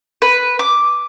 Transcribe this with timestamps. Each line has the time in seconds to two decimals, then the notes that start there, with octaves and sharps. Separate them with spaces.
0.22 B4
0.59 D6